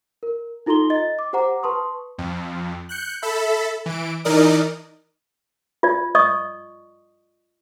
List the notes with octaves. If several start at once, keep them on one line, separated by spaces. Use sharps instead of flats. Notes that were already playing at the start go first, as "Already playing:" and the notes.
A#4
D#4 F4 A4 A#5 C6 G7
D#5 A6
D6
G4 C5 F#5 A#5 D6
B4 A5 C6 C#6 D#6
F2
F#6 G6 C#7
A4 E5 B5
E3 D7
E3 D#4 A#4 D5 D#5 D#6
F4 D5
D5 D#5 C#6 D#6